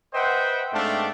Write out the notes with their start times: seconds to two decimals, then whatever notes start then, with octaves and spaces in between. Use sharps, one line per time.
0.14 B4 C5 D#5 E5 F#5 G5
0.73 G#2 A3 C4 D4 A4 F5